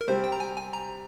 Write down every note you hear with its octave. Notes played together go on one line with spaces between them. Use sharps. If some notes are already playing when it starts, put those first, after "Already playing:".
A#4
C3 G3 C4 G4 C5
G5
A#5
G#5
G#5
A#5